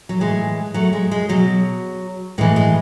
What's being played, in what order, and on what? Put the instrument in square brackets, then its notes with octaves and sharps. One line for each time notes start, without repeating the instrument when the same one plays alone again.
[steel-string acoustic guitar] F#3
A2 E3 G#3
F#3 A3
G#3
G#3
B2 F#3
A2 E3 G#3
G#3